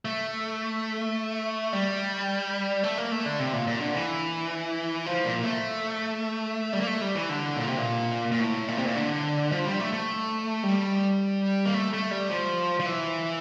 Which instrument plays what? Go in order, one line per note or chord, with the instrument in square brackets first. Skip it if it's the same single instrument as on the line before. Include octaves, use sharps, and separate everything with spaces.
[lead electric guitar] A3
G3
A3
A#3
A3
D3
C3
A#2
A#2
D3
E3
F3
A#2
A3
G3
A#3
A3
G3
E3
D3
A#2
C3
A#2
A#2
A2
A#2
C3
A#2
D3
F3
G3
A3
A3
G3
A#3
A3
A3
G3
F3
F3
E3